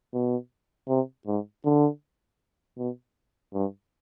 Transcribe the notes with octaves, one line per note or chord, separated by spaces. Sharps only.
B2
C3
G#2
D3
B2
G2